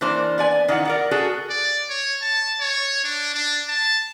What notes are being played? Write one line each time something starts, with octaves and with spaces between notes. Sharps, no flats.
E3 A#3 D4 C5
B3 D5 G#5
D#3 E3 F4 F#5
A#4 D5 F#5
F#4 G#4 A4
D5
C#5
A5
C#5
D4
D4
A5